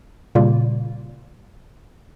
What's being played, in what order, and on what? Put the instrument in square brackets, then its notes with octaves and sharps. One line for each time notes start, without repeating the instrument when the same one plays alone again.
[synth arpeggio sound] A#2 C#3 G3 A#3 F4